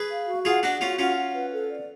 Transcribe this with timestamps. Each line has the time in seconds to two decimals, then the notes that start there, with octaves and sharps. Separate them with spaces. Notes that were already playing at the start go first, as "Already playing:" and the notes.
Already playing: G#4 B4
0.10 F5
0.27 F#4
0.45 F4 G#4 F#5
0.63 D4 F#4 F#5
0.81 C#4 F4 F#4
0.99 C#4 F4 F#5
1.17 F#5
1.35 B4
1.53 A4
1.71 D5